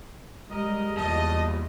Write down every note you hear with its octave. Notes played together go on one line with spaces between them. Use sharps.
G3 G#3 A#4 D#5
E2 A#2 G3 D#5 A5